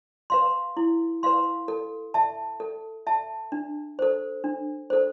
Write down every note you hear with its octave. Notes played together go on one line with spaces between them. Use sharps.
B4 F5 C6
E4
B4 F5 C6
A4
E5 A5
A4
E5 A5
D4
A4 C5
D4
A4 C5